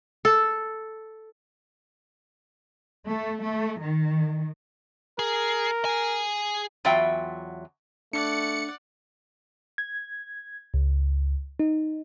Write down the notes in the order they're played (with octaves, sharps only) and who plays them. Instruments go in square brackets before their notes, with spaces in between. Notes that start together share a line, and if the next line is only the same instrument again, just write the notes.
[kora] A4
[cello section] A3
A3
D#3
[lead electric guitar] G#4 [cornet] A#4
[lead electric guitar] G#4 G#5
[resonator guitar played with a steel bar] E2 F#3 F4 E5 G5
[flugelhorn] A3 [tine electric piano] D4 [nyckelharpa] D5 F#5 [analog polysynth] C#7
[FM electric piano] G#6
C#2
D#4